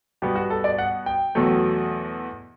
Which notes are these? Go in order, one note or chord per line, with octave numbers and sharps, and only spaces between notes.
B2 G3 B3 G4
F#4
A4
D5
F#5
G5
E2 B2 F#3 A3